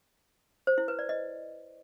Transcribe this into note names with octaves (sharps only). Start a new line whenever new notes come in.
C5
E4
B4
D5
D#5